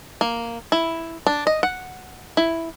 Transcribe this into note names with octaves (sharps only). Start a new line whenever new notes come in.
A#3
E4
D4
D#5
F#5
E4